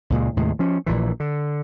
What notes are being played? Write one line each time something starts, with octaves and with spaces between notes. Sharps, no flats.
C#2 A#2 G#3
D#2 A2 C3 G#3
F3 C#4
A#1 A#2 E3
D3